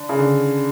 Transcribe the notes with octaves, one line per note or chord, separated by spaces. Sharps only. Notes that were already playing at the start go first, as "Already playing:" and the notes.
Already playing: D3
C#3
D3